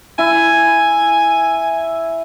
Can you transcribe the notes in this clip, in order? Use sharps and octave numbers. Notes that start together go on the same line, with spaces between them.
E4 G#5